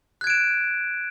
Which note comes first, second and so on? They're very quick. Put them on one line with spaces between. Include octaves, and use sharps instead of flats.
F#6 G#6 D7 E7